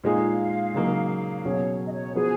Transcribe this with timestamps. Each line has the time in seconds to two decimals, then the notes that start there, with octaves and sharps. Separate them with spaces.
0.04 A#2 G#3 D#4 G#4 F5
0.74 C#3 F#3 A#3 D#4
1.45 B2 F#3 C#4 G#4 C#5
1.87 D#5
1.92 C#5
2.15 F3 B3 F#4 G#4